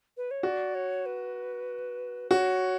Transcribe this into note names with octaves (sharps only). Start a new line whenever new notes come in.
B4
C#5
F#4 D5
C#5
B4
F#4 C#5